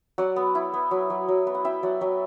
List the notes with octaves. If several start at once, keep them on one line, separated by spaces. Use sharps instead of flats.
F#3 D5 F#5
B3
E4
B3
F#3
F#3
F#3
B3
F#5
E4 E5 G5
F#3 D5 F#5
F#3 E5 G5